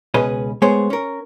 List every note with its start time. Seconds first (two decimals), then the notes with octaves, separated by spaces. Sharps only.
0.14 C#2 B2 C#4 G#4 B4 D#5
0.62 G#3 A3 B3 G#4 C5 C#5
0.90 C#4 A#4